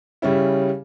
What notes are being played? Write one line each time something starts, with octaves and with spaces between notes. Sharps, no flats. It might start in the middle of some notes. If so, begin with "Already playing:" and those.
C#3 G3 C#4 E4